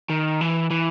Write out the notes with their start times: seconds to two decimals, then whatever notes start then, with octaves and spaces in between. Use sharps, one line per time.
0.09 D#3
0.41 E3
0.70 E3